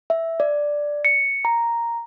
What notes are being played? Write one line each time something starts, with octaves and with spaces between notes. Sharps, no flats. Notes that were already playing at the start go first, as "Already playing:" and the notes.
E5
D5
C#7
A#5